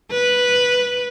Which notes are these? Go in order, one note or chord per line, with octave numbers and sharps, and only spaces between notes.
B4